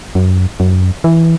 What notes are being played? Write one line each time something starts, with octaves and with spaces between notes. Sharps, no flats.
F#2
F#2
E3